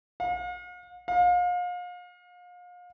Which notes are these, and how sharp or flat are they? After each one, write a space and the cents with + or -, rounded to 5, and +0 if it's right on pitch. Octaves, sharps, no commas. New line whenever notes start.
F5 +45
F5 +35